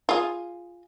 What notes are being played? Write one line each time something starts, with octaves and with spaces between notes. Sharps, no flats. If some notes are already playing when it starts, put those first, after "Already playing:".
F4 G#4